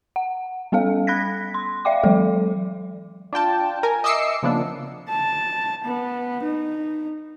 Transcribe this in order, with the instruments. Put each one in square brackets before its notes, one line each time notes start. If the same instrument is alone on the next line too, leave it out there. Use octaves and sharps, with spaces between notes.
[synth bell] F#5
G3 B3 C#4 A4 F5
B5 F#6 G#6 A#6 B6
C6
D5 E5 F5 G5 D6
E3 F#3 G#3 A4
[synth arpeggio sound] D4 F4 G5 A5
A#4 G#5
D#5 E5 D6 E6 C7 C#7
C#3 F3 A#3 B3 D4
[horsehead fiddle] A5
B3
D#4